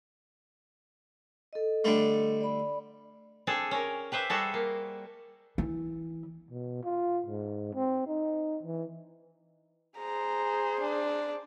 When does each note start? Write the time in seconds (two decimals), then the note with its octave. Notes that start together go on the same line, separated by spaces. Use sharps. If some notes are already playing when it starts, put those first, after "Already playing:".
1.53 A4 D#5
1.84 D3 G3 A3
2.41 D5 B5
3.47 C4 D4 G#4 A4
3.71 C#4 A#4
4.12 G4 B4 C5 E5
4.30 G3 F#4 G#4 A4
4.54 A#3
5.58 E3
6.51 B2
6.84 F4
7.26 G#2
7.74 C4
8.07 D#4
8.63 E3
9.98 G#4 C5 A#5
10.80 D4